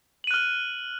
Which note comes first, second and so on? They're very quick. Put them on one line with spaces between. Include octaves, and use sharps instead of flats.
F#7 D#7 F#6 F6